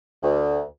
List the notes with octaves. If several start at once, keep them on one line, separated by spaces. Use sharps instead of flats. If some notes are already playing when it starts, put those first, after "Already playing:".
D2